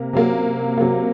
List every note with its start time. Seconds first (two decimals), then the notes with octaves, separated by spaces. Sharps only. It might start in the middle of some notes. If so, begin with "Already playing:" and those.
Already playing: C3 A#3
0.13 C3 F#3 A#3
0.78 C3 F#3 A#3